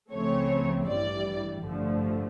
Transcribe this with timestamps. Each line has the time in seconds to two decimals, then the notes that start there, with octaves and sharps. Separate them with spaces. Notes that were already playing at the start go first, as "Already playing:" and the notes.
0.10 C#2 C#3 F3 A3 C4 C#5
0.86 A1 G2 E3 G3 D5
1.62 A1 G2 D3 F3 A3